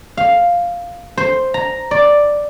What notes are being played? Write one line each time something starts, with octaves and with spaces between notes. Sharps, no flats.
F5
C5
A#5
D5